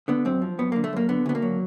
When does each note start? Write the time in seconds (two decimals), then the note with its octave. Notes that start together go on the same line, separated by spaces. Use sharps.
0.08 D3 B3
0.25 F#2 C4
0.42 F3
0.59 F#2 B3
0.72 D3 A#3
0.84 A3
0.93 F#2 A#3
1.09 D3 B3
1.26 D2 B3
1.35 A#3
1.42 F#3